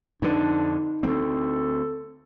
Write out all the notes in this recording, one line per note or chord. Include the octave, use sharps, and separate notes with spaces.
F2 D3 D4 D#4 B4
D2 A#3 C4 A4